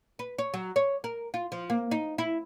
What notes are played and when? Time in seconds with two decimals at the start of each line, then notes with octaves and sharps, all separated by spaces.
0.19 B4
0.39 C#5
0.54 F#3
0.76 C#5
1.04 A#4
1.34 F4
1.52 F3
1.70 A#3
1.91 D#4
2.18 E4